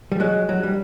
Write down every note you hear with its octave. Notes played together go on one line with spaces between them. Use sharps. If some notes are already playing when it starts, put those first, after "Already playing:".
G3
F#3 G#3
F#3
G3